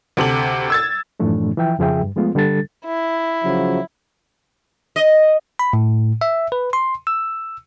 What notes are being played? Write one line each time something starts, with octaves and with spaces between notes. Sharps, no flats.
D2 C3 A4 F#7
E6 G#6 A6
F#2 A2 E3 F3 A3 D4
E3 F3 E5 G5
F2 C#3 F3 G#4 E5 G5
G2
F3 G#3 A3 B3 F4
D3 G3 D4 A4 A6
E4
C#3 F3 F#3
D#5
B5
A2
E5
B4
C6
E6